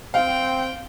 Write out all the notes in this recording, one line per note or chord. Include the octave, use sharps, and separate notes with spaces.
C4 F5 G5